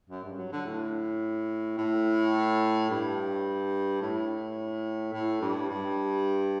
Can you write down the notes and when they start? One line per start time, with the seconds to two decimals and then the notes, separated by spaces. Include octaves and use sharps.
0.10 F#2
0.24 G2
0.38 F#3
0.52 D3
0.65 A2
1.78 A2
2.90 G2
4.02 A2
5.13 A2
5.41 G2
5.70 G2